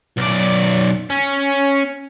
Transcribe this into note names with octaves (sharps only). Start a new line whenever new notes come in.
B1 D5
C#4